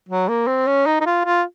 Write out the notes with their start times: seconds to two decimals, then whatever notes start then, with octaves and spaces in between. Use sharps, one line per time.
0.09 F#3
0.28 A#3
0.47 C4
0.67 C#4
0.86 D#4
1.00 D#4
1.06 F4
1.25 F4